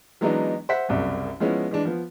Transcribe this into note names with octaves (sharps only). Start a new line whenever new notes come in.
E3 F#3 G#3 B3 D4 D#4
C5 E5 F#5 B6
F#1 C2 F#2
F3 G#3 B3 C#4 E4
E3 G#3 D4
F3 B3